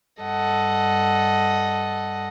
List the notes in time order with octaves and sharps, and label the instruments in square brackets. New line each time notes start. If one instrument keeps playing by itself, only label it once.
[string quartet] G2 A4 D#5 F#5